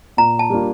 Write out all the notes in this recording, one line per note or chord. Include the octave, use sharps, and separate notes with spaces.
A#2 A#5
A5
G3 A#3 D4 F4